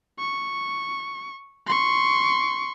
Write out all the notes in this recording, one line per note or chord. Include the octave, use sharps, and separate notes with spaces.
C#6
C6 C#6